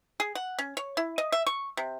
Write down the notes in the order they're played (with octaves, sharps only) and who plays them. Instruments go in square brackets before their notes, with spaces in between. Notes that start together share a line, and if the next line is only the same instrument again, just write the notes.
[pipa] G#4
F#5
C#4
C#5
E4
D#5
E5
C#6
C3